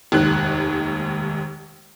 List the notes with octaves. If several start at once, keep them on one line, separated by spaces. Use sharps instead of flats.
F1 D#2 G#2 F#6